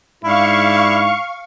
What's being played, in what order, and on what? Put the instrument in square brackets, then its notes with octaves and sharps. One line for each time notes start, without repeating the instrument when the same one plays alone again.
[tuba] G#2 [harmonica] D4 E4 [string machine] F5 C#6